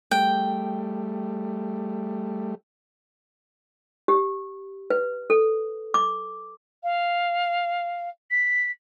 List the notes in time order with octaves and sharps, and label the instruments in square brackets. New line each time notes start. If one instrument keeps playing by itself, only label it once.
[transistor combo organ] G3 A3 [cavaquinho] G5
[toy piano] G4
B4
A4
D6
[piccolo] F5
B6